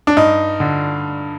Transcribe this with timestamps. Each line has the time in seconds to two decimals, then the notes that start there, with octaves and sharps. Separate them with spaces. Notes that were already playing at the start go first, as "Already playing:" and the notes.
0.07 D4
0.17 G2 D#4
0.60 D3